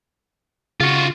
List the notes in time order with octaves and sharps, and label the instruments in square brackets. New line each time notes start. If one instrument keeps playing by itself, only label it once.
[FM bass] C#3 [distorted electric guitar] F4 F#4